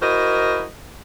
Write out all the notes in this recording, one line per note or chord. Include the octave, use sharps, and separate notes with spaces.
E4 F#4 A#4 C5 D#5